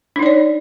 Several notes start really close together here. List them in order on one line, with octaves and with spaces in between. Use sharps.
D4 D#4 D5 C#5